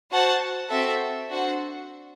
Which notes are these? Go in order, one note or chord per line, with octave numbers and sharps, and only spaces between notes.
F#4 C5 F#5 A5
C4 F#4 A4 E5
D4 F#4 C5 F#5